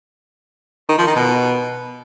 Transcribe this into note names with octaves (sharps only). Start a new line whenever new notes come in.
D#3
F3
D#3
B2